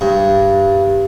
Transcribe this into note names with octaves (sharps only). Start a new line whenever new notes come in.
G2